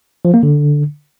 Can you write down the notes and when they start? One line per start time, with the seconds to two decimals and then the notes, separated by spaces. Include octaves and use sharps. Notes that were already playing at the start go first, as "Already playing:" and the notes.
0.25 F3
0.34 A#3
0.43 D3